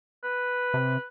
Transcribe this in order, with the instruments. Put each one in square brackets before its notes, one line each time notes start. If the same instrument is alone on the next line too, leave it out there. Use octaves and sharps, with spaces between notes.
[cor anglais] B4
[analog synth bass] C3